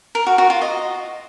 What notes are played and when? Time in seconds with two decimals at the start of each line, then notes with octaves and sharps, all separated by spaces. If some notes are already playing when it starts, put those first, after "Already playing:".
0.15 A#4
0.27 F#4
0.38 F#4
0.50 F4
0.62 D#5